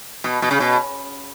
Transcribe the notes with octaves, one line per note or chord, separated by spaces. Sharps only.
B2
B2
C#3
B2